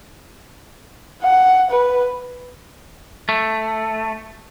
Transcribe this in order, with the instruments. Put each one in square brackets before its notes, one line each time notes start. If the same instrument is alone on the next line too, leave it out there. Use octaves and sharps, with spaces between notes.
[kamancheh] F#5
B4
[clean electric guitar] A3